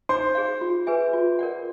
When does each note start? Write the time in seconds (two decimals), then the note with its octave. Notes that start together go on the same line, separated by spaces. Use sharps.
0.09 D#4 C5 C6
0.35 G#4 C#5 F5
0.61 F4
0.87 G#4 B4 E5 G#5
1.13 F4
1.39 A#4 D5 F#5